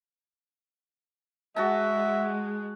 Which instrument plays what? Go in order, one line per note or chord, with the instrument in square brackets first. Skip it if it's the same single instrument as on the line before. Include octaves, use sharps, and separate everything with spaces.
[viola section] G#3 [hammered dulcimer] F#4 A5 [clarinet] E5